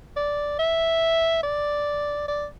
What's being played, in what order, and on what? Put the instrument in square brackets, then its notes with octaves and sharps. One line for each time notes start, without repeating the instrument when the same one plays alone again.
[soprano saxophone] D5
E5
D5
D5